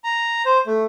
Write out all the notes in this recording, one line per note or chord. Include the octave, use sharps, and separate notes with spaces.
A#5
C5
A3